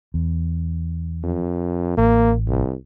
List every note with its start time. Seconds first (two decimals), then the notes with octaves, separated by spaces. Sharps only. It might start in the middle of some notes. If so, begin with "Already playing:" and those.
0.14 E2
1.23 F2
1.97 A1 A#3
2.48 C2